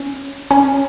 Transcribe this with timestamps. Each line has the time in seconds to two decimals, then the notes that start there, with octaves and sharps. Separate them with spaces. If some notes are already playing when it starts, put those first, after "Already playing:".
Already playing: C#4
0.51 C#4